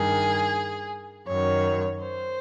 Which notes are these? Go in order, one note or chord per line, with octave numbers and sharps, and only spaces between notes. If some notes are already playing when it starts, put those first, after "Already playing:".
Already playing: G2 D#3 G#4
F#2 D#3 C#5
C5